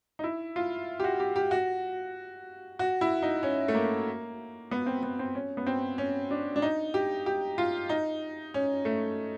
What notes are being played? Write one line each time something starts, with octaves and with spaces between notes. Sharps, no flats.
D#4
E4
F4
G4
F#4
G4
G4
F#4
F#4
E4
D#4
C#4
A3
A#3
B3
C4
B3
C4
C#4
B3
C4
C#4
D4
D4
D#4
G4
G4
F4
D#4
C#4
A3